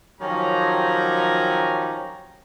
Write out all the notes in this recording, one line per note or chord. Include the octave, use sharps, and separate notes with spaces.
D#3 F3 F#3 C#4 G4 A#5